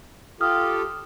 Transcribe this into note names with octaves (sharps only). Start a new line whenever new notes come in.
F4 G4 A4 D#6 F6